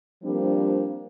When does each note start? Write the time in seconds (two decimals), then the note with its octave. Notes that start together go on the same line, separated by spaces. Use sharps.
0.23 F3 G3 A#3 C4 D4